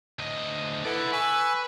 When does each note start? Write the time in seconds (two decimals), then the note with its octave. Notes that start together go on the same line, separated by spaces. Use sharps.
0.19 D2 D#5
0.85 E4 A4 B4 D5 F#5
1.13 B4 G#5 C#6 E6